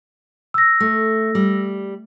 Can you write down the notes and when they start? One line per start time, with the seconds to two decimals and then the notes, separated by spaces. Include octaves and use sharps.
0.54 E6 A#6
0.80 A3
1.35 G3